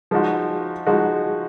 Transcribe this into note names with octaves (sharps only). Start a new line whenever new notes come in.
F3 G#3 D#4 F#4
F3 G#3 D#4 F#4